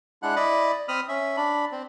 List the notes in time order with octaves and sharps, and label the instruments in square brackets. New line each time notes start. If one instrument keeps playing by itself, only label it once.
[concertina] G#3 D4 E4 F#5 F#6
E4 D5 D#5 B5
C4 B5 D#6 F6
C#4 E5
D4 B5
C4